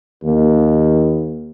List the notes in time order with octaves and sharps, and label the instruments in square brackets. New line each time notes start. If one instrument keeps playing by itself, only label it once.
[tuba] D#2